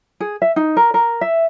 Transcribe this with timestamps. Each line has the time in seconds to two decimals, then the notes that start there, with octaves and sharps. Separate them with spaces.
0.20 G#4
0.42 E5
0.56 D#4
0.77 A#4
0.94 A#4
1.21 E5